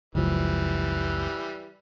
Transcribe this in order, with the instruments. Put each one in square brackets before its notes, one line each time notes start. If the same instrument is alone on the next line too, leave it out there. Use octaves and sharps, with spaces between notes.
[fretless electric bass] F#1 C#2 F3 [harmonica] E3 G3